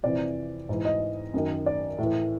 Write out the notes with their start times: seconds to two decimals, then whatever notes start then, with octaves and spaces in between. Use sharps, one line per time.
0.03 F2 C3 E3 D5
0.69 G#2 E3
0.85 D#5
1.34 F#2 D#3
1.66 D5
1.98 A2 E3